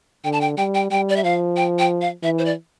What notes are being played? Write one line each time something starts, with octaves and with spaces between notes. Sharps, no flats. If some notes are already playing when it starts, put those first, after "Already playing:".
D3 G5
A5
G5
G3 G5
G5
G3 G5
D5
E5
F3 F5
G5
G5
F5
E3 E5
C5
D5